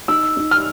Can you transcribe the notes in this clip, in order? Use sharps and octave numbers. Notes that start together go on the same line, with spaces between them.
D#4 E6
D#4
F6